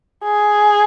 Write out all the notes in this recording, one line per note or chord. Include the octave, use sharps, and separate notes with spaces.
G#4